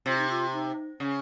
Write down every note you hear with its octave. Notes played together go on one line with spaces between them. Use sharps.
C3 F4
D#4
F4
D#4
C#3 C#4